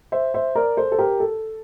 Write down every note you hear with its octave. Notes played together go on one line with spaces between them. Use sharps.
C5 E5
C5 E5
A#4 D5
A4 C5
A4
G4 A#4
A4